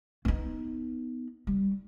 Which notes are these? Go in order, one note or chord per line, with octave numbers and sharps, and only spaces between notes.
B3 D#4
G3